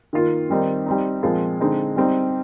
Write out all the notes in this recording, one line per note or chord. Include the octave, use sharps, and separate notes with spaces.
D#3 A#3 F4
D#3 G3 C4 D#4
G3 C4 D#4
A#2 F3 G#3 C4 F4
D3 G#3 C4 D#4
G3 C4 D#4